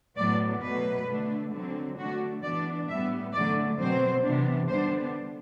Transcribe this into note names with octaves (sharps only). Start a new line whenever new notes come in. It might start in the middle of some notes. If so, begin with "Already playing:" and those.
A2 F#3 B3 D5
B2 F#3 A3 B4
D3 A3 D4
D3 F#3 C4
D3 A3 D4 F#4
E3 B3 D4 D5
A2 G3 B3 E5
D3 F#3 A3 D5
B2 F#3 C4 C5
C3 E3 B3 D4
D3 G3 B3 D4 C5